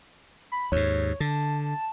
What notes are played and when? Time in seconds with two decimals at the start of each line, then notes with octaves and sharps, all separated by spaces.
0.52 B5
0.72 D#2 G#2 C#5
1.20 D3 A5